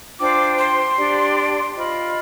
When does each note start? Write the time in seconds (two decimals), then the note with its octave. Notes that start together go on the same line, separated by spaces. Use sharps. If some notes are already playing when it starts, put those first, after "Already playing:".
0.19 D4 F4 C5 G5 D6
0.59 C6
0.97 D4 G4 D5
1.75 F4 C5 D#5 B5